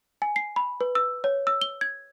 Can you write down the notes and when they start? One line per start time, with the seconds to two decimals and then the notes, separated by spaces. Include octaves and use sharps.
0.22 G#5
0.36 C7
0.56 B5
0.81 B4
0.95 E6
1.24 C#5
1.47 E6
1.62 G7
1.81 G#6